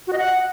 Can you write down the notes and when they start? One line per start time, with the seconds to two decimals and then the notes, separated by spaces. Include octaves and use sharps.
0.07 F#4
0.13 D#5
0.18 F#5